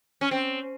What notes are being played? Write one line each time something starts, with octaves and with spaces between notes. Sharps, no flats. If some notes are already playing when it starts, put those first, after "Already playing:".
C#4
C4